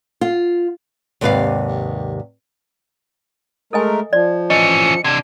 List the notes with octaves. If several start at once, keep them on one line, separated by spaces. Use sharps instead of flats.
F4
D#2 G#2 C3 B4 D5 F5
G#3 A3 A4 A#4 D#5 G#5
F3 D5
E3 C#4 D#5 C#7
C3 D4 G#6